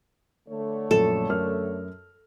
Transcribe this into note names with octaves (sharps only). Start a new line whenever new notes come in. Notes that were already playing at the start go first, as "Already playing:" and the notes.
D3 A3 C#5
A#1 F#2 A4
F#2 A#4 F6